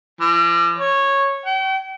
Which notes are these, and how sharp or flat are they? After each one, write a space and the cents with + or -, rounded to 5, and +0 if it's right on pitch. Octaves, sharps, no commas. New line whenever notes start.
F3 -45
C#5 -10
G5 -40